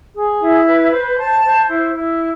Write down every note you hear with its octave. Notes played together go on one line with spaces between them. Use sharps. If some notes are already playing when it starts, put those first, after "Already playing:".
G#4
E4
B4
C5
A5
C5
E4
E4